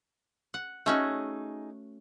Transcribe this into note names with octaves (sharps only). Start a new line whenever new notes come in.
F#5
A3 C#4 D#4 F#4 G#4 E5